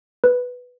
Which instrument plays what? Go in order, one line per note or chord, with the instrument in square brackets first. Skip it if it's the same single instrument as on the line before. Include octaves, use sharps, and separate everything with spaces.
[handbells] B4